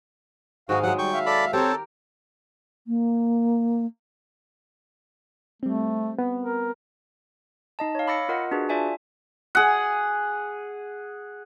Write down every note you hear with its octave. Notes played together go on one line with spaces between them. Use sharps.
G#2 D#3 G#3 F#4 F5
F#3 G#3 F#5
G3 G5 C#6
E5 F5
A4 D5 B5
C4 G4 A4 A#4 C5 C#5
A#3
G3 A3 C4
B3
A#4
D#4 D#5 A5
C#5 F5
B5 D6 E6 A6 A#6 C#7
F4 A#4 D#5 F#5
D4 F#4 G#4 B4
F4 D5 E5 G#5 A5
G#4 F#5